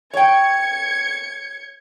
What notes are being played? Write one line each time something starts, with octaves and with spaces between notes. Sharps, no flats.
C#5 G5 G#6 C#7